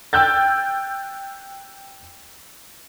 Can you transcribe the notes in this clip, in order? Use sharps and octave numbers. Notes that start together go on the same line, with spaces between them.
G5 E6 F#6 G6 A6